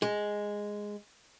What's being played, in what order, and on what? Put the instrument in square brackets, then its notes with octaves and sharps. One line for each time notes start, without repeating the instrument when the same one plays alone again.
[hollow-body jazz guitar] G#3